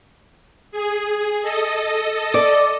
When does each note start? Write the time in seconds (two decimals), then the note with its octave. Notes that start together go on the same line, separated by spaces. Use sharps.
0.72 G#4
1.42 A4 D#5
2.34 D5